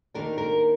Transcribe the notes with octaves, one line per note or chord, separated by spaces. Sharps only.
D#2 D#3 A#3 D4 A#4
A#4